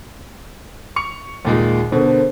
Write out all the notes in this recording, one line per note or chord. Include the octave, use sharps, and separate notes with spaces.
C#6 C#7 F7
D#2 A#2 G#3
B2 D3 A4 A#4 C5